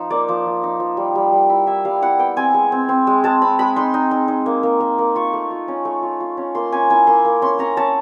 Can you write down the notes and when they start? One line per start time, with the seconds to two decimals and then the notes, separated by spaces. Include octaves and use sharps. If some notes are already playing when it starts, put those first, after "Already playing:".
Already playing: F3 D#4
0.10 A#3 D5
0.28 F3
0.46 F3
0.63 D#4
0.80 F3
0.97 G3
1.15 G3
1.32 G3
1.49 E4
1.67 E4 E5
1.85 G3 F5
2.02 E4 F#5
2.19 B3 G5
2.36 C4 G#5
2.54 G#3
2.72 C4
2.89 C4
3.07 G#3
3.24 G#3 A5
3.42 C4 B5
3.59 G#3 B5
3.76 D#4 C6
3.94 D#4
4.11 D#4
4.28 D#4
4.46 A#3
4.63 A#3
4.80 A#3
4.99 A#3
5.15 F4 C#6
5.33 A3
5.51 F4
5.68 C#4
5.85 A3
6.02 F4
6.20 F4
6.37 C#4
6.55 A#3 C6
6.72 C#4 G#5
6.90 E4 G#5
7.07 A#3 C6
7.25 A#3
7.42 C#4 C6
7.59 C#4 A#5
7.77 C#4 A5